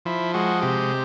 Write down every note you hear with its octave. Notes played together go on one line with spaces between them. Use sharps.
F3 E4
G#3 F#4
C3 G4